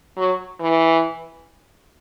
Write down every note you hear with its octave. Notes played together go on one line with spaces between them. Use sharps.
F#3
E3